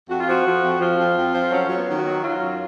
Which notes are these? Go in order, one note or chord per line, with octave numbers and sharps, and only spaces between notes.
F2 F#4
F4
F3 F#4
F3
F2
F3 F4
F2
F2
F3
F#3 C#4
F#3
B3
D#3
F#4
F#3
F#3 F4
F#2